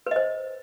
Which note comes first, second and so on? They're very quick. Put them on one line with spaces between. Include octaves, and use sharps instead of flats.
B4 D#5 C5